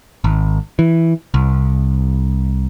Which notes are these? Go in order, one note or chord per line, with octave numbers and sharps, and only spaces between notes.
G#1
E3
C2